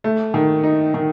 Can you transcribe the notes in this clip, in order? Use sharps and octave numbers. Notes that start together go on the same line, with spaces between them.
A3
D#3
D#4
D#3